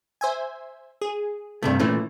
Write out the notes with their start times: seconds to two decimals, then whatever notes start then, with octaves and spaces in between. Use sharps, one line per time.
0.21 C5 E5 G#5
1.01 G#4
1.63 G2 C3 A3
1.80 A#2 E3 A3 C#4